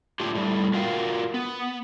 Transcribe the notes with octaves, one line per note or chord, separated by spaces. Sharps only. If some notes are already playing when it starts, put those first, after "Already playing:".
A2 D4 F4 G4
A2 G3
F4 F#4 A#4 F5 G5
B3